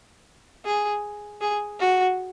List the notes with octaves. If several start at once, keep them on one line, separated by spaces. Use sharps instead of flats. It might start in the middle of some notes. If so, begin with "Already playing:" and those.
G#4
G#4
F#4